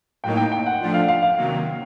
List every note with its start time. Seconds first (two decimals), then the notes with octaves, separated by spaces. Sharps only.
0.24 A2 F#3 A#3 D#4 G5
0.37 G5
0.52 G5
0.66 F#5
0.80 F3 A3 D4 F4
0.94 F5
1.08 F5
1.23 F5
1.37 C3 D#3 F#3 A#3